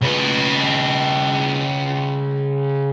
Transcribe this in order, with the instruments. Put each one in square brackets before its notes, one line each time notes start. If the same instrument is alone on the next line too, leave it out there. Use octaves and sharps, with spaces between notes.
[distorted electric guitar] C#3 B4